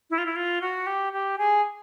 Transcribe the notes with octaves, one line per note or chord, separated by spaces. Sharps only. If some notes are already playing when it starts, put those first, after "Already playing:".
E4
F4
E4
F4
F#4
G4
G4
G#4